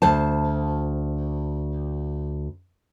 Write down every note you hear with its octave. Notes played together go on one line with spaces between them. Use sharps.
D2 C5 A5